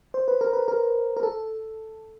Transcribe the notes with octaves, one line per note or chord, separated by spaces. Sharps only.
C5
B4
A#4
B4
A#4
A#4
A4